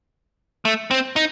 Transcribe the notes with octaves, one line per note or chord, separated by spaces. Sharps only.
A3
C4
D#4